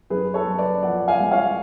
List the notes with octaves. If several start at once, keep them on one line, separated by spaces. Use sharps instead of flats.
F#2 G#4 B4
A4 C#5
F#2
B4 D5
F3 D5 F#5
F5 G#5
G#3
C#5 F5